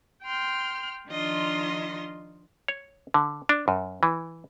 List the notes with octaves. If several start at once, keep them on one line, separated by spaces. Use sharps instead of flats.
G5 C6 F6
D#3 F3 D4 F4 D#5 C6
C#5
D3
D4
F#2
E3